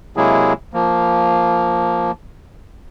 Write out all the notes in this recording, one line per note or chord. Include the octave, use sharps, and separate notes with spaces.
C3 F#3 G#3 A#3 E4 G#4
F3 A#3